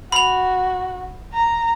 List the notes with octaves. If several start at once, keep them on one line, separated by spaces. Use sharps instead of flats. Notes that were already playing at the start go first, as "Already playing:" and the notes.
F#4 B5 F7
A#5